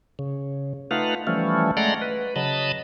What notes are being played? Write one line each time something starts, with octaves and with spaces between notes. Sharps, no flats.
C#3
A3 D#4 F4 B4 F5 F#5
E3 F3 G3 A3 C#4
G#3 A3 D5 F#5 A#5 C6
B4
C#3 F#3 D#5 A5 B5